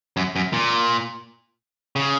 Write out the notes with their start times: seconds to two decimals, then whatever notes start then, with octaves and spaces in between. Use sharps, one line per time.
0.17 F#2
0.36 F#2
0.53 A#2
1.96 C#3